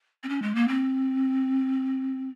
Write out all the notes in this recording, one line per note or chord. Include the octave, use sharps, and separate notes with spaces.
C4
C#4
G#3
A#3
C4